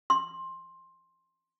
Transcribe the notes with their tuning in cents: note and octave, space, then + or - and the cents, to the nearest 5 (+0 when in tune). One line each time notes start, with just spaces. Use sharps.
C6 +15